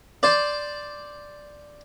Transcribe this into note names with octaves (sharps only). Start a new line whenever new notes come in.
C5 D5